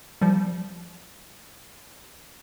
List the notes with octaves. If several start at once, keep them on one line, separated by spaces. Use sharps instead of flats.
F3 G3